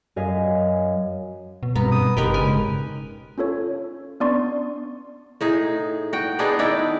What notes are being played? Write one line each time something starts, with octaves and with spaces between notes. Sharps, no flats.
F#2 D#5 F5 G#5 B6
B2
G2 C3 B3 A#5
D#6
F#1 G#2 G#3 G4 A#4 B4
C#3 A#4 G#5
C#4 F4 A4 C#5
B3 C#4 D4 D5 C6 C#6
A2 D#4 G#4
F#4 G5
B3 D4 D#4 G#4
D#3 E4 D5 G5